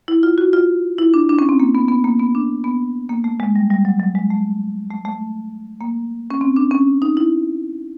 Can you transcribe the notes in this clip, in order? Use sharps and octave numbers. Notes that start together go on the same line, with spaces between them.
E4
F4
F#4
F4
E4
D4
D4
C#4
C4
A#3
B3
B3
A#3
B3
D4
B3
A#3
A3
G#3
G3
G3
F#3
F#3
G#3
A3
A3
A3
A#3
C#4
C4
D4
C#4
D#4
E4